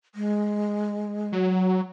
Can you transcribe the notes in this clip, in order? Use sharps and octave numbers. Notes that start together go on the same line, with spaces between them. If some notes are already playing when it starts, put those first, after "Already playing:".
G#3
F#3